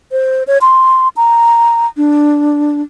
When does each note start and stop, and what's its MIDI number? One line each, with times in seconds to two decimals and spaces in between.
0.12 0.43 72
0.47 0.58 73
0.61 1.08 84
1.17 1.87 82
1.97 2.81 62